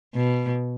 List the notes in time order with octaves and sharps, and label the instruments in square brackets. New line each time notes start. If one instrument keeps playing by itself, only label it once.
[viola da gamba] B2